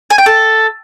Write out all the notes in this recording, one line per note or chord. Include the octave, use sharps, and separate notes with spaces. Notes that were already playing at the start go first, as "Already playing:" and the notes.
G#5
G5
A4